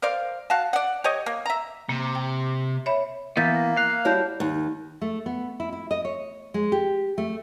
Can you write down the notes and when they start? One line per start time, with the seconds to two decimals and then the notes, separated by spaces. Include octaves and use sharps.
0.02 A#4 C5 D5 F5
0.50 F#4 F5 A5
0.73 D5 F#5
1.04 G4 C#5 D#5
1.26 A#3
1.46 E5 A#5
1.89 C3 A#3
2.15 G5
2.86 C#5 E5 B5
3.37 E3 A#3 B3 E5 G6 A6 B6
3.56 A#6
3.77 F5 F#6
4.05 G3 E4 F#4 C#5 A5 G6
4.40 D#2
5.01 A3
5.26 B3
5.60 E4
5.72 E4
5.91 D#5
6.05 C#5
6.54 G#3
6.72 G4
7.18 A3